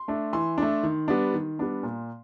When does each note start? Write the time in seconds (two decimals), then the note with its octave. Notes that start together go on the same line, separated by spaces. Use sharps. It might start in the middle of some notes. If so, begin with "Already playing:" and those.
Already playing: C6
0.08 A3 D4
0.33 E3 C6
0.58 A3 D4
0.83 D#3
1.08 G3 B3 D4
1.34 D#3
1.59 G3 B3 D4
1.83 A#2